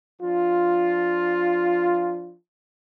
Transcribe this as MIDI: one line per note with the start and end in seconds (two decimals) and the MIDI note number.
0.22 2.37 53
0.22 2.37 62
0.22 2.37 65